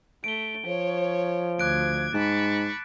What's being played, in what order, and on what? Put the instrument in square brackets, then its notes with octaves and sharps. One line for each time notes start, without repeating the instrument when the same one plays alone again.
[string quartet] A3 [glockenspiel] D7 G7
[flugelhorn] F3 [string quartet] C#5
[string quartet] D2 G#6 [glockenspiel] D6 F#6 D7
[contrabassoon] G#2 [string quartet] A5 B5 C#6